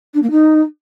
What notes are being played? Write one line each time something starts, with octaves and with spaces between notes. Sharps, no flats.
D4
A#3
D#4